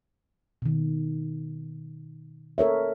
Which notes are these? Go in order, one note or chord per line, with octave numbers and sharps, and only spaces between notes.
B2 D#3
A4 A#4 C#5 E5